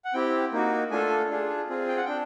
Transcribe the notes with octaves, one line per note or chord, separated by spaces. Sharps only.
F#5
C4 E4 G4 G5
A#3 D#4 F#4
A3 D4 F4 A4 G#5
D4 F4 G#4
C4 F4 G#4
G5
F#5
D4 G5